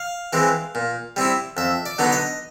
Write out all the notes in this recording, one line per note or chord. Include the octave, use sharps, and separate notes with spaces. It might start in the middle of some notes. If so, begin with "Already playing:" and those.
Already playing: F5
E3 G#3 C4
A#2
G3 C4 E4
F2 E5
D5
D3 F#3 B3 D#4
D#5